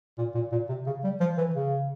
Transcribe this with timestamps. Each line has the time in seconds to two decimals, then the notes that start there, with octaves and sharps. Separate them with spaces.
0.18 A#2
0.35 A#2
0.52 A#2
0.69 C3
0.86 C#3
1.04 G3
1.20 F3
1.37 E3
1.54 C#3